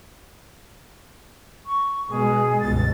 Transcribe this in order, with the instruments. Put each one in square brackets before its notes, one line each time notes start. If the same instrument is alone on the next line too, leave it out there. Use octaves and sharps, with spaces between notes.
[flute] C#6
[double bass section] B2 G#3 [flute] G#4
[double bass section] G1 C#2 B2 [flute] A6